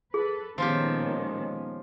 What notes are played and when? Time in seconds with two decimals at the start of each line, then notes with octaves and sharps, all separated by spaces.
0.14 G#4 A4 B4
0.58 A#2 D#3 F3 G#3 B3 C#4 F4 G4